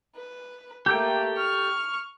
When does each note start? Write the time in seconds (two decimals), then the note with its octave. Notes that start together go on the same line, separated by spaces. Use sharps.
0.15 B4
0.86 A3 A#3 G4 A4 G5
1.37 C#6 F6